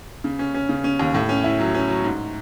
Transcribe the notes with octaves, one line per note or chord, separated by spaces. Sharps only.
C#3
C#4
C#4
C#3
C#4
D#2
A2
C#4
E4
F#3
C#4
F#3
G#2